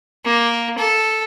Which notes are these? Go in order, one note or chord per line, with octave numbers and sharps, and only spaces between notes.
A#3
A4